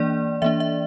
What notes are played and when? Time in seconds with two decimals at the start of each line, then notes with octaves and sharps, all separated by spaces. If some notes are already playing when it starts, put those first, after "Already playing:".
Already playing: E3 A#3 D4 D5
0.42 E3 A#3 D4 E5
0.60 E5